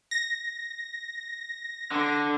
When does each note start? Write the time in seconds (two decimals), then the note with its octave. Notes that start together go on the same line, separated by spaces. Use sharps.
0.11 A#6
1.91 D3